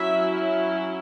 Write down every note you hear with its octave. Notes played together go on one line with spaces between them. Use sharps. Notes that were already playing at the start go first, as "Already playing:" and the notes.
Already playing: F#3 C#4 E4 E5